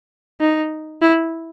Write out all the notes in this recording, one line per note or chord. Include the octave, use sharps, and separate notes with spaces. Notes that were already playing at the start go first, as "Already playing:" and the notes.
D#4
E4